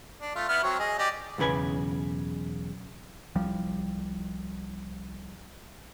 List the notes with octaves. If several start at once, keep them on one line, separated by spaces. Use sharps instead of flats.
D4
A3 F4
B3 E4 F6
F#3 C4 C#5
G#4 D#5
G4 D5 D#5
B1 E2 C#3 B4 G#5
C2 F3 G3